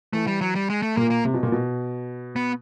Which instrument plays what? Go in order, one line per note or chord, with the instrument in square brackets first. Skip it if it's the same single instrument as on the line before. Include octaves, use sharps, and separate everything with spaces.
[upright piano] E3 [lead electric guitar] A3
[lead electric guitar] G3
F#3
G3
G#3
A3
[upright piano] A#2 [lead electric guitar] A#3
[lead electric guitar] A#3
[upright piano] C3
B2
A#2
B2
[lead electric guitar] B3